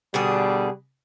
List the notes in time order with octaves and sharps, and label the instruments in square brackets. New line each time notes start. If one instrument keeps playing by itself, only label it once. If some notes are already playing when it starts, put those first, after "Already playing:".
[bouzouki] B2 D3 G#4 [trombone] G3